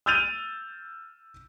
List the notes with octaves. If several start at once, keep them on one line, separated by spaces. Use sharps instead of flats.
E6 F6 G6 A6 D#7 F7